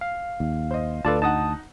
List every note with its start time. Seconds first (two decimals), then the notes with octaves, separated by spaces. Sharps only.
0.01 F5
0.40 D#2
0.71 C5 D#5
1.05 D2 F4 A4 B4 D5 A5
1.22 D#4 F#5 A5 D#6